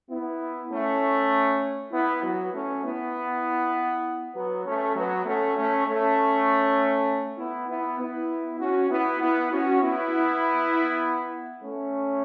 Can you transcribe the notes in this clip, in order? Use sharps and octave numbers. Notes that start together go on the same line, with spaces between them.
B3 E4
A3 C#4
B3 E4
F#3 B3
A3 C#4
B3 E4
F#3 B3
A3 C#4
F#3 B3
A3 C#4
A3 C#4
A3 C#4
B3 E4
B3 E4
B3 E4
C#4 F#4
B3 E4
B3 E4
C#4 F#4
B3 E4
A3 C#4